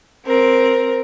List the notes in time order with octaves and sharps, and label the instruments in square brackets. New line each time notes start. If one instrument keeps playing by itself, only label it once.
[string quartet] C4 A#4